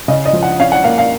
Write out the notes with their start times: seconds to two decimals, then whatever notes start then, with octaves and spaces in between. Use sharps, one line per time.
0.08 C#3 D#5
0.26 D#5
0.33 F3
0.43 F#5
0.60 C#4 F5
0.72 F#5
0.84 A#3 F5
0.98 F5